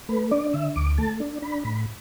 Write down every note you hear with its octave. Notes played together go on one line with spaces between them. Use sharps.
A3 B4
D4 D5
D3 E5
D2 D6
A3 A5
D4
D4 B5
A2 B5